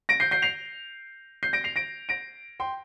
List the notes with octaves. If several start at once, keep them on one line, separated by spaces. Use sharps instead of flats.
A#6 D7
G6 C7
G6 C7
C7 F7
G6 C7
A#6 D7
C7 F7
A#6 D7
A#6 D7
G5 C6